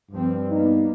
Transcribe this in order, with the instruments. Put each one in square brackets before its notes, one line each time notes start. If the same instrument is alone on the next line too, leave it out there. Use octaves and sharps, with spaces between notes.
[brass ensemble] G2 [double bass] F3 C4
[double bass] A#3 B3 [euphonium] D#4